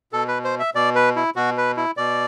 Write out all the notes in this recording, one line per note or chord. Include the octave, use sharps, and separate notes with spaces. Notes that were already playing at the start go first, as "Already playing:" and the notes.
B2 A4
B4
C5
E5
B2 D5
B4
E4
B2 F#4
B4
E4
B2 D5